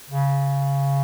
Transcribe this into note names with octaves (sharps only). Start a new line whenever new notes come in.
C#3